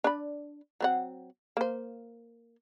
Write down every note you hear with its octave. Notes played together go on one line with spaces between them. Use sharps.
D4 D5 B5
F#3 C4 F#5
A#3 C5